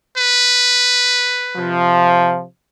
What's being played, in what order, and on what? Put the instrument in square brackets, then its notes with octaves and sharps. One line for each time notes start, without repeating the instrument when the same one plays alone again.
[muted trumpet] B4
[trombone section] C3 F3